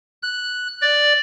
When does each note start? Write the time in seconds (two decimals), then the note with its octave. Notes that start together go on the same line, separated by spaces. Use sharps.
0.23 F#6
0.82 D5